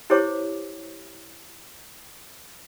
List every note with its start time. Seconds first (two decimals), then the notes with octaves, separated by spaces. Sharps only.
0.10 E4 G4 C5 C#5 D6